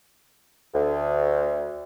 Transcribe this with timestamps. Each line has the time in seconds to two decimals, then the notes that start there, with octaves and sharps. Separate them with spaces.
0.74 D2